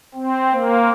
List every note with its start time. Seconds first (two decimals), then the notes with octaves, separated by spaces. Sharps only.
0.14 C4
0.51 A#3